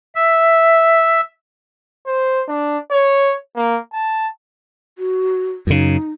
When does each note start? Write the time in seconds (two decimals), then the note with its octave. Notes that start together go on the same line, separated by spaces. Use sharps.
0.15 E5
2.07 C5
2.48 D4
2.91 C#5
3.56 A#3
3.93 A5
4.98 F#4
5.67 F#2 C#3 D#4